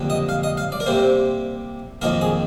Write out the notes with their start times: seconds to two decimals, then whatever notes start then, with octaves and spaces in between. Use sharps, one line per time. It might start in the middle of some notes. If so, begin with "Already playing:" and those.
Already playing: F2 D3 G3 A#3
0.10 D#5
0.29 F5
0.43 D#5
0.57 F5
0.72 D5
0.80 A#4
0.86 C3 G3 A#3 C5
2.02 F2 D#3 A#3 A#4
2.21 G#4